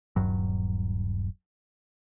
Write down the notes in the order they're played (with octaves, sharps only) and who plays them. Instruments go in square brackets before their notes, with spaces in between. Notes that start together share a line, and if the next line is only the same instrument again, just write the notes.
[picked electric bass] D#1 G2 F#3